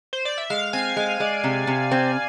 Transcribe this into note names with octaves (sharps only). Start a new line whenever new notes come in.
C5
D5
E5
G#3 F5
C4 G#5
G#3 F5
G#3 D5
C3
C3
C4